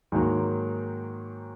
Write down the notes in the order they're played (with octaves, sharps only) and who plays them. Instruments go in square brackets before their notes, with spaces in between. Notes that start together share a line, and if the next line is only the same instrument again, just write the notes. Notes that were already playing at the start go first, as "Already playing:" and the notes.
[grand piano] G#2 D#3 F#3 A#3